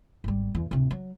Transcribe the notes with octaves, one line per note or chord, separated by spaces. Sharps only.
G#1 G3
E2
D1 C3
F#3